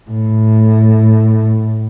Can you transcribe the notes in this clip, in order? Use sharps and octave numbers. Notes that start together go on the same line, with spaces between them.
A2